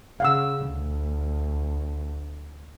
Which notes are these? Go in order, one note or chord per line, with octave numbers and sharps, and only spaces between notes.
C#3 F5 F#5 E6
D2